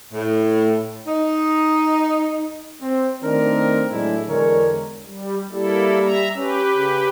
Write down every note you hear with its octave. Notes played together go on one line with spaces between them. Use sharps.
A2
D#4
C4
D#3 A3 C4 D4 A#4
A2 F#3 G#3 D4 E4
E2 D3 G#3 A#4 C#5
G3
G3 A#3 E4 A4
E5 A#5
C#4 G4 B4
C#3